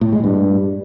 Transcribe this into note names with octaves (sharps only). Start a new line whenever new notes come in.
A2
G#3
G2